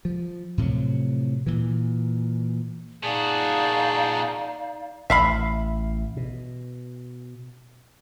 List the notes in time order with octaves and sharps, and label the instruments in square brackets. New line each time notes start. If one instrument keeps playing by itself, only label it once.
[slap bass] F3
A2 C3 F3 F#3
A#2 E3
[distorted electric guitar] A#2 F#4 [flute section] D#4 D5 F5 [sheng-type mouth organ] G#4 A5
[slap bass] A1 [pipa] E5 F5 B5
[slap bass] B2